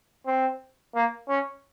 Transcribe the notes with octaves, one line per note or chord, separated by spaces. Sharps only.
C4
A#3
C#4